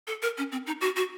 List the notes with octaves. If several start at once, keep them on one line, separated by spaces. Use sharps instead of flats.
A4
A#4
C#4
C4
D#4
F#4
F#4